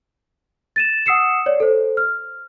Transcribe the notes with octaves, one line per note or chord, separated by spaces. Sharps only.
A6 D#7 E7
F#5 D#6 E6 C7 C#7 E7
C#5 D5
A4 C5
F6